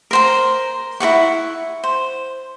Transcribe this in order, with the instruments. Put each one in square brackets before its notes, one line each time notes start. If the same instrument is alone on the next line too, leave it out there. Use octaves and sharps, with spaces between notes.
[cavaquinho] A#4 C5 A#5
E4 A#4 F#5 C#6
C5